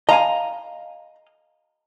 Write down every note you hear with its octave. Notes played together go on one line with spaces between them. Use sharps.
D#5 F5 G#5 A#5